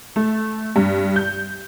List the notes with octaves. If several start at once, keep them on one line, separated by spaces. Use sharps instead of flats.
A3
G2
G6